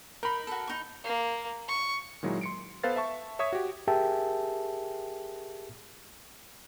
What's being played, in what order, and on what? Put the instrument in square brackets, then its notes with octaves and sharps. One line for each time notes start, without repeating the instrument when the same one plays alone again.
[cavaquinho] D#4 [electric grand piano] A#4 B5
[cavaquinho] F#4 A4
D#4 C#6
[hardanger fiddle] A#3
C#6
[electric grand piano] A#2 D#3 F#3 G#3 E4
C6 C#7 D7
B3 A4 B4 C5 F5 A6
E5 A5 C#6
C#5 E5 C#6 D#6 G#6 B6
F#4 G4
[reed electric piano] G4 G#4 A#4 E5 G5 A5